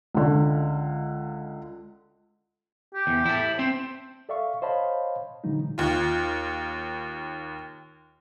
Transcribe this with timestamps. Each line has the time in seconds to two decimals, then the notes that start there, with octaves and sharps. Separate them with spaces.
0.15 C#2 D3
2.94 G4
3.07 E2
3.26 E4 A5
3.59 C4 C5
4.29 A4 D5 E5 F5 C#6
4.62 C5 C#5 D#5 F5 A5 B5
5.44 A#2 D3 E3 F#3 G#3 D#4
5.78 D#2 F4